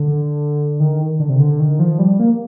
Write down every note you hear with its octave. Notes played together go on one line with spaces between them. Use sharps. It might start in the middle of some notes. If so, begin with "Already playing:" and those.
Already playing: D3
D#3
D3
C3
D3
D#3
F3
G3
A#3